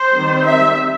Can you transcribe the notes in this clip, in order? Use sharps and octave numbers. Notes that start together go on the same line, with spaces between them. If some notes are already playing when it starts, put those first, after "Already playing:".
Already playing: C5
D#3 G3 C4
E5